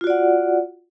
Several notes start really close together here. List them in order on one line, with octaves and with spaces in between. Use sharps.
F4 F#4 D5 F#5